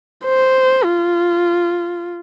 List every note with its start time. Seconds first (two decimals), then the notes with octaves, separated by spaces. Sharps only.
0.25 C5
0.85 F4